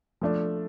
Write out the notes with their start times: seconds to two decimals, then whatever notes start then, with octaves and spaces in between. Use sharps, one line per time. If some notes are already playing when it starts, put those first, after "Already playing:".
0.21 F3 A3 D4